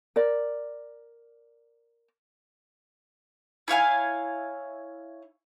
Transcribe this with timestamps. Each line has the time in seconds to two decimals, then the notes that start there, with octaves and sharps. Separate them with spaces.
0.16 A#4 D5
3.68 E4 C#5 F5 G#5